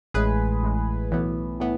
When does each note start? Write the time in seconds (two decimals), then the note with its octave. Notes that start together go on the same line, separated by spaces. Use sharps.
0.14 A1 A2 G#3 G#4 B4
0.63 A1 A2 G#3
1.11 B1 A2 E3 B3
1.60 A2 E3 B3